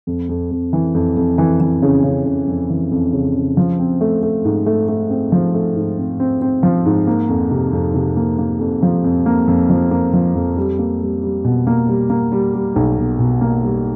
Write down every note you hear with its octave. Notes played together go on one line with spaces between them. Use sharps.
F2
F2
F2
E3
F2
F2
E3
E3
C#3
C#3
C#3
F2
E3
F2
C#3
C#3
F3
C4
A3
A3
G#2
A3
A3
C4
F3
A3
G#2
C4
C4
C4
F3
G#2
A#3
F2
C3
F2
C3
A#3
A#3
F2
F3
F2
A#3
F2
F3
A#3
F3
F2
G3
A#3
G3
G3
B2
A#3
G3
A#3
G3
G3
B1
B2
B2
A#3
G3